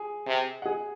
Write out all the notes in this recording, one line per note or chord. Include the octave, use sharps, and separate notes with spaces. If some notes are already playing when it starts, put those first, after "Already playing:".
Already playing: G#4 G#5
C3
F#5
G#4 G#5